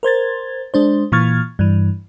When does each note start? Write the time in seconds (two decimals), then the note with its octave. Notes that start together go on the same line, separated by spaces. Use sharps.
0.03 A#4 C5 G#6 A6
0.74 G#3 D4 C5
1.12 A#2 E3 C#6 F6 G#6 A6
1.59 G2 E3